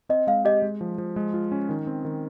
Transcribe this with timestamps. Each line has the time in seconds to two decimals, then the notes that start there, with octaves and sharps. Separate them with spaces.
0.09 C4 D#5
0.27 G#3 F5
0.45 G4 D#5
0.62 G#3
0.81 F3
0.98 F3
1.16 G#3
1.34 F4
1.52 C#4
1.69 D#3
1.87 C4
2.05 D#3